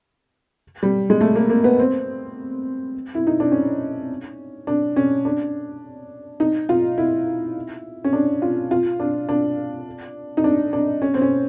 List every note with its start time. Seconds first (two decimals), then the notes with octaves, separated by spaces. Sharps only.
0.83 G3
1.10 G#3
1.21 A3
1.36 A#3
1.50 A#3
1.64 B3
1.79 C4
3.15 E4
3.27 D#4
3.40 D4
3.52 C#4
4.67 D4
4.96 C#4
5.25 D4
6.40 D#4
6.69 F4
6.98 E4
8.04 C#4
8.13 D4
8.42 F4
8.71 F4
9.00 D4
9.29 D4
10.37 D#4
10.44 D4
10.73 D4
11.02 C#4
11.14 C4
11.22 C#4